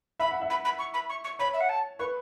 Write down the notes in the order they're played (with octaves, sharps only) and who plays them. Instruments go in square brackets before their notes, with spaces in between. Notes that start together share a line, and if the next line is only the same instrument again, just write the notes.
[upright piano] E5 [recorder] B5
[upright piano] F#5
E5
[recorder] B5
B5
C#6
B5
C#6
C#6
[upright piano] C#5 [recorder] B5
[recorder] E5
F#5
A5
[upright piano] B4 [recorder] C#6